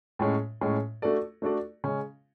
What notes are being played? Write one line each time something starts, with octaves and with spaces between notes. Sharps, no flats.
A2 G#3 C#4
A2 G#3 C#4
A3 D4 F#4 A4 D5
A3 D4 F#4 A4 D5
C#3 G#3 C#4